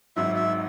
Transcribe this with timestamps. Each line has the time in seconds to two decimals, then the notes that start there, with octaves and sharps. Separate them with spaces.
0.16 G#1 G#2 F#3 E5
0.36 E5